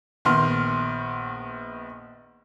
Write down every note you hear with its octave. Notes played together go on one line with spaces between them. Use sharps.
A#1 D#3 B3 C6 F6